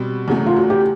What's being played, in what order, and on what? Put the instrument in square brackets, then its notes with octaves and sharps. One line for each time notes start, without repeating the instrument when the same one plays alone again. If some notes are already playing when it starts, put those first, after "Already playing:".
Already playing: [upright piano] B2 G3 C4
E2 C#3 F#3 A3
[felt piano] F4
F#4
G4